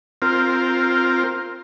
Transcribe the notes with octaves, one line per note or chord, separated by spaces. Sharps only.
C4 F4 A#4